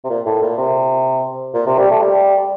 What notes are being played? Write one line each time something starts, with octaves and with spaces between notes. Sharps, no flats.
C3
A#2
A2
A#2
C3
A#2
C3
G3
A3
G3